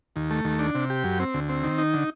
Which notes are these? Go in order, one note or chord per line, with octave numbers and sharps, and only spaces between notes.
D#2
A3
D#2
D4
C3
G4
F#2
C4
D2
C4
D#3
D#4
D3